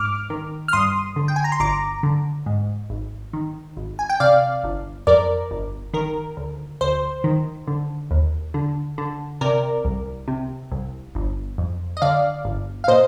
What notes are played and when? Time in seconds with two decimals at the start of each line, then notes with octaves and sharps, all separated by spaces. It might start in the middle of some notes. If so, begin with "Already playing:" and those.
Already playing: G#2 D6 F6
0.30 D#3
0.68 F6
0.73 G2 C6 D#6
1.16 D3
1.28 G5
1.36 G#5
1.44 A#5
1.52 C6
1.60 G1 A#5 D6
2.03 D3
2.46 G#2
2.90 G#1
3.33 D#3
3.77 G#1
3.99 G#5
4.09 G5
4.20 C3 D5 F5
4.64 G1
5.07 F2 A#4 D5
5.51 G1
5.94 D#3 A#4
6.37 D2
6.81 D2 C5
7.24 D#3
7.67 D3
8.11 D#2
8.54 D3
8.98 D3
9.41 C3 A#4 D5
9.85 C2
10.28 C3
10.72 C2
11.15 G1
11.58 F2
11.97 D#5
12.02 D3 D5 F5
12.45 G1
12.84 F5
12.88 A#2 C5 D#5